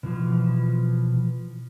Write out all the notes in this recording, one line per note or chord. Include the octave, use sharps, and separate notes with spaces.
B2 E3 F3